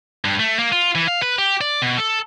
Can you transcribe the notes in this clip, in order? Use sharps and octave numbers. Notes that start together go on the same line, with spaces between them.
G2
A3
A#3
F4
E3
F5
B4
G4
D5
B2
A4